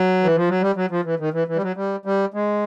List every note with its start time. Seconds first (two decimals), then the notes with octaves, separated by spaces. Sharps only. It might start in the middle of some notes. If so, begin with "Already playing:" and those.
Already playing: F#3
0.23 E3
0.36 F3
0.49 F#3
0.62 G3
0.76 F#3
0.91 F3
1.05 E3
1.19 D#3
1.33 E3
1.48 E3
1.56 G3
1.62 F#3
1.76 G3
2.05 G3
2.34 G#3